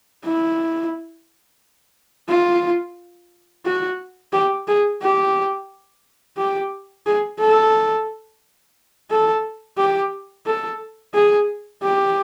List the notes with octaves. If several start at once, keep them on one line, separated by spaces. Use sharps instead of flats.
E4
F4
F#4
G4
G#4
G4
G4
G#4
A4
A4
G4
A4
G#4
G4